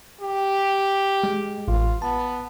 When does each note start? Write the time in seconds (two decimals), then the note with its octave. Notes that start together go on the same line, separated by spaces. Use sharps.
0.21 G4
1.24 G#3
1.68 A1 F4
2.02 B3 A5